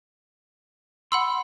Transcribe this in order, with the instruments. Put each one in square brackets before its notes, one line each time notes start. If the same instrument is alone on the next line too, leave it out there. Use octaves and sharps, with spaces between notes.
[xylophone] F#5 B5 E6 [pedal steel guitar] C6